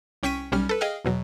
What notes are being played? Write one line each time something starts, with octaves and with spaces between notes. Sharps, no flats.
C2 C#4 G5 C#6 B6 D#7
B1 G3 C#4 F6
A4 B4
G#4 D#5 F5 G5 F6
E2 B2 F#3